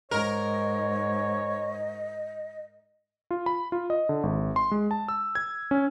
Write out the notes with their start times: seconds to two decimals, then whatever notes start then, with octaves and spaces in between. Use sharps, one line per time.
0.11 G#2 A#4 C#5 D#5
3.31 F4
3.46 B5
3.72 F4
3.90 D#5
4.09 D3
4.23 G#1
4.56 C6
4.71 G#3
4.91 A5
5.08 E6
5.35 G#6
5.71 C#4